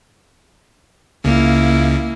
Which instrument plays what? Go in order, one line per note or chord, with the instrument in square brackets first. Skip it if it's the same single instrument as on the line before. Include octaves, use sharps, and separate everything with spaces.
[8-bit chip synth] C#2 C#3 [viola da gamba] A#3 E4